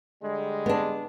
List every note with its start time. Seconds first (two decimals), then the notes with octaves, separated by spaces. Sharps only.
0.22 D3 G3 G#3
0.66 B3 D4